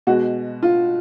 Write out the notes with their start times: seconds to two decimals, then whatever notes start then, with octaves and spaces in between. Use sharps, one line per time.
0.07 B2 G#3 F#4
0.63 F4